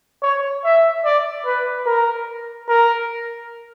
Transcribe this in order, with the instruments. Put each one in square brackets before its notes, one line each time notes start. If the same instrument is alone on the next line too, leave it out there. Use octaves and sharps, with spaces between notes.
[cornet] C#5
E5
D5
B4
A#4
A#4